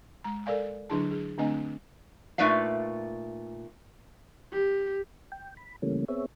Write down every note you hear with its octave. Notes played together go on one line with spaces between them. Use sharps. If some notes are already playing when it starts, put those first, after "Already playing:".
G#3 A#5
A4 A#4 D5 F5 G#5
D3 F#3 D4 E4 G#4 A5
G#4
D3 A3 C4 D4 D#5 G#5
A#2 A3 D#4 B4 D5 F5
G4
G5
B5
C#3 E3 G3 A3 A#3 C#4
B3 C4 G#4 C#5 E5